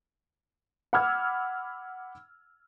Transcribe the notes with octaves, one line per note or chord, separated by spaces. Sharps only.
F#5 B5 D6 E6 F6 G#6